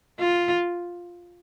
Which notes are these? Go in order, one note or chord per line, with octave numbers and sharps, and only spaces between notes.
F4